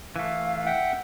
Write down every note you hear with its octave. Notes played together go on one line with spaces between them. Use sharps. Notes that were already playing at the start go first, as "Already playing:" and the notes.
E3 A3 F5
E5 F#5 G5